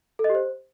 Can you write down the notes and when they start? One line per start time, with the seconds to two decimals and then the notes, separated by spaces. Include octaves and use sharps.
0.19 A4
0.24 D#5
0.30 G4
0.35 C5